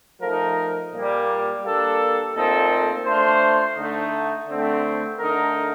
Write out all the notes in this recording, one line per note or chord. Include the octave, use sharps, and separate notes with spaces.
F3 A3 D#4 A#4
A#2 G3 A#3
G3 A#3 D4 A4
A#2 A3 C4 D#4 A4
A3 D4 F4 C5
D3 A3 D#4
D3 A3 C4
D3 A3 D#4 A#4